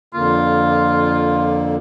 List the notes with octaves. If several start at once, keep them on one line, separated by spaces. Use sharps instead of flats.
F2 D3 A#3 F4